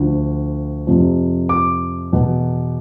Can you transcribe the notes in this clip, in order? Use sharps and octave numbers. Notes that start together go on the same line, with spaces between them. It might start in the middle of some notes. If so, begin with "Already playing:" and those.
Already playing: D2 D3 F3
F2 C3 F3
D6
E2 B2